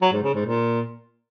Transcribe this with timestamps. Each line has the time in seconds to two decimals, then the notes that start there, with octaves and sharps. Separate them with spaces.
0.01 F#3
0.12 G#2
0.23 C#3
0.34 G#2
0.45 A#2